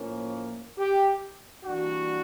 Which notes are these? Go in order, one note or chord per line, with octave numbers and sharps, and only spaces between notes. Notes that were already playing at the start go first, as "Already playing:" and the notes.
Already playing: A2 F3 A#3 C#4
G4
E3 G3 A#3 D4 F#4